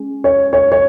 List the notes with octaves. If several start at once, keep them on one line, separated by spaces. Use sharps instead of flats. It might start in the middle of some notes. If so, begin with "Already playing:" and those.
Already playing: G#3 C#4
C#5
C#5
C#5